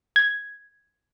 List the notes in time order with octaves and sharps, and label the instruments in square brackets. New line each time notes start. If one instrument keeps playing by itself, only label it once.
[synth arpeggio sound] G#6